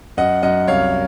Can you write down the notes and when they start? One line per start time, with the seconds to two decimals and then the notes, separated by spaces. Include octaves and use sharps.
0.17 F#2 D#5 F#5
0.43 F#2 D#5 F#5
0.68 C2 C#5 F5